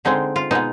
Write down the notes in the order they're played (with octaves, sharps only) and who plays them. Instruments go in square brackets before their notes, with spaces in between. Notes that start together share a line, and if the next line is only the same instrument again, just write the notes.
[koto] D3 G#3 C4 D#4
F4
B2 G#3 B3 D#4